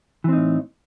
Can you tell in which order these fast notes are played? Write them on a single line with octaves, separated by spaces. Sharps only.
E3 C4 D#4 A2